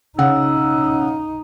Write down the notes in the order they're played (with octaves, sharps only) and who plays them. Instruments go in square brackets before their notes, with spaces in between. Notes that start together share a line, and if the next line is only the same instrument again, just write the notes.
[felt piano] C#3 F#5 [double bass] D#4 [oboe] E6